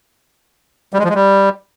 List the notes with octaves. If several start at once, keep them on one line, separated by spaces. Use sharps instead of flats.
G3
G#3
F3
G#3
G3